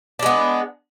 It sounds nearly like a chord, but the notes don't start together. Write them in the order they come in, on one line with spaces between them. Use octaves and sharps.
D4 G#3 B3